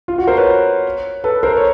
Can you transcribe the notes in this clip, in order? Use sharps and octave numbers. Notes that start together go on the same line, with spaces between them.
F4
F#4
A#4 C5
B4 C#5
A4 B4
A#4 C5
C#5